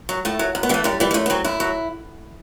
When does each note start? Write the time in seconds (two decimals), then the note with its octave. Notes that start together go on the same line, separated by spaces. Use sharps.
0.09 F#3
0.25 A2 A3
0.39 F#3
0.55 F#2
0.63 B3
0.69 E3 G3 A3
0.84 F#2 G3
1.00 E3 G3
1.11 G3
1.14 F#2 A3
1.26 B3
1.30 F#3 C4
1.44 F#2 E4
1.60 F#3